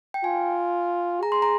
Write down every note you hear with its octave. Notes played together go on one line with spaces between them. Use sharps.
G5
F4 G#5
G#4 A#5
C6
A#5